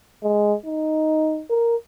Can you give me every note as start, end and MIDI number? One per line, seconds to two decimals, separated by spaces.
0.23 0.55 56
0.66 1.43 63
1.50 1.76 70